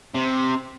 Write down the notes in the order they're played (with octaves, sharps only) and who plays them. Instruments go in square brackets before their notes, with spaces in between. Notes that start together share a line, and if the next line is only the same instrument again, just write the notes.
[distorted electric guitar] C3